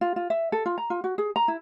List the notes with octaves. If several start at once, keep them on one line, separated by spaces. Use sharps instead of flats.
F4
F4
E5
A4
F4
A#5
F4
F#4
G#4
A#5
E4